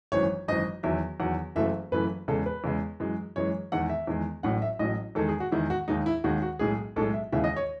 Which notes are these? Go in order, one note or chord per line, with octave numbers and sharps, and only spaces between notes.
G#1 F#2 E3 C#5
G#1 F#2 E3 D#5
E2 D#3 F#3 E5
E2 D#3 F#3 F#5
F#1 F#2 E3 A3 E5
F#1 F#2 E3 A3 B4
E2 C#3 G#3 A4
B4
E2 C#3 G#3
F#2 E3 G#3
F#2 E3 G#3 C#5
E2 D#3 G#3 F#5
E5
E2 D#3 G#3
A1 A2 F#3 F#5
E5
A1 A2 F#3 D#5
E2 D#3 G#3 A4
G#4
F#4
E2 D#3 G#3 E4
F#4
D#2 D#3 G#3 D#4
E4
D#2 D#3 G#3 F#4
F#4
B1 A2 G#3 G#4
B1 A2 G#3 A4
E5
D#2 C#3 E3 G#3 E5
D#5
C#5